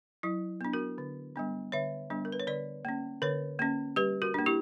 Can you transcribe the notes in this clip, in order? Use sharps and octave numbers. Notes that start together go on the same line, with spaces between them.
F#3 E4
B3 D4
F#4 A#4
D3
G3 B3 D4
D3 C#5 E5
G3 B3 D4
A#4
B4
C#5
D3 B4 D5
A#3 C#4
D3 A#4 C#5
A#3 C#4
G3 G4 B4
F#4 A#4
A#3 D4
E4 G4